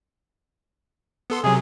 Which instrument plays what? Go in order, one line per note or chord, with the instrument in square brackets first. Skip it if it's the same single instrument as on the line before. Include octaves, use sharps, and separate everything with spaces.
[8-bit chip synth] B3 A4 C6
[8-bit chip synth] C3 F#3 [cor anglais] G#4